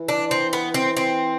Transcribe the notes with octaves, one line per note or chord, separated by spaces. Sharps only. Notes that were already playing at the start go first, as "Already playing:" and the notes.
Already playing: E3
D4
C4
B3
C4
C4